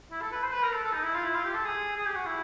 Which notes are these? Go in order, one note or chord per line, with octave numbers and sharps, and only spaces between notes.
E4
A4
B4
C5
B4
A#4
A4
A4
D#4
E4
F4
E4
F4
G4
A4
G#4
G#4
G4
F#4
E4